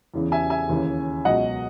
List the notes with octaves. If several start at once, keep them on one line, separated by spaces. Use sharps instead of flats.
E2 C#3 E3
E5 G#5
E5 G#5
D#2 C#3 E3
C#2 B2 F#3 D#5 F#5